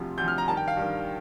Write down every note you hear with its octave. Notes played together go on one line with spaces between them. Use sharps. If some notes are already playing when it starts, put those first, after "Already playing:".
Already playing: D2 C3 F3
D2 C3 F3 G6
F6
A#5
G2 D#3 A5
G5
F5
G2 D#3